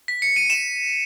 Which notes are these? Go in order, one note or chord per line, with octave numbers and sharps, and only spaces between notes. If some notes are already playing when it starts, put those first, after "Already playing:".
B6
C#7
D#7
E7